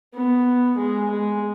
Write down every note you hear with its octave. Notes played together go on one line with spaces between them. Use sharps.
B3
G#3
G#3